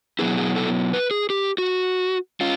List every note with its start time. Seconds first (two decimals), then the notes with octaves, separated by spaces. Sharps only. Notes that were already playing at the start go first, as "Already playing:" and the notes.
0.19 B2 F#3 B3 E4 G#4
0.37 G#4
0.56 A4
0.93 B4
1.11 G#4
1.30 G4
1.58 F#4
2.41 C#4 F4